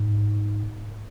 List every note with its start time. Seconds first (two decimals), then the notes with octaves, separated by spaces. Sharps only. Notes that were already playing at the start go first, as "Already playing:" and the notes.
Already playing: G#2